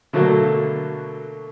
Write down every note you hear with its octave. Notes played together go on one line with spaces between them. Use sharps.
B2 D3 F#3 A3 A#3 F#4